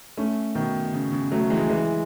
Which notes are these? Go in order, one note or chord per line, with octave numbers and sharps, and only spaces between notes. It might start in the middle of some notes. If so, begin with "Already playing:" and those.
A3 C#4
B2 D#3
C#3
C#3
F#3 A3
E3 G#3
E3 G#3